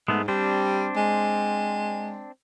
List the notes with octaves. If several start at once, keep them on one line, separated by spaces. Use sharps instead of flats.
G#2 G#3 A3 B3
G3 C4 D4 C5
G#3